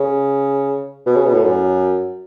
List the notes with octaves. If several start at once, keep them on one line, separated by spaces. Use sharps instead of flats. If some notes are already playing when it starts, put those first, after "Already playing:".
Already playing: C#3
B2
C#3
B2
A2
F#2